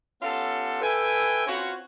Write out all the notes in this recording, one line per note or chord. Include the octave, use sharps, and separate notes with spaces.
B3 C#4 F4 G4 A4
A4 B4 E5 G5 G#5
C4 C#4 F4 F#4 B4 C#5